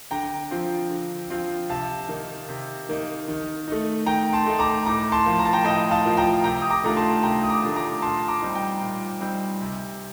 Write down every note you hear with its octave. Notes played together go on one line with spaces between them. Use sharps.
D3 G5 A#5
F3 C4 F4
D3
F3 C4 F4
C3 F5 A5
D#3 A#3 D#4
C3
D#3 A#3 D#4
D#3
A3 D#4
D#3 G5 A#5
A5 C6
A3 D#4
A#5 D6
A2 A#5 D6
A5 C6
F3 A#3 F4
A#5
A5
G5 A#5
A2 D#5 G5
F5 A5
F3 A#3 F4
G5 A#5
C3 G5 A#5
D#6
A#5 D6
D#3 A3 D4 F4 A#5
A5 C6
C3 G5 A#5
D#6
A#5 D6
D#3 A3 D4 F4
A#5 D6
A#2 A5 C6
A#5 D6
G3 C4 D#4
G5 A#5
A#2
G3 C4 D#4
C3